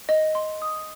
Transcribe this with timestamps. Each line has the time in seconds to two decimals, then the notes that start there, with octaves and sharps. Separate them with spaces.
0.09 D#5
0.35 C6
0.62 D#6